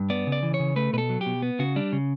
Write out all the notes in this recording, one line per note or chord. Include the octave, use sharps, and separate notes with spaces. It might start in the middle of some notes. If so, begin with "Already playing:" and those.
Already playing: G2
B3 D5
C#3
D5
E3
C#5
C#3
A3 B4
B2 A4 B4
F#3
G4
B2
B3
C#3 F#4
G3 D4
C#3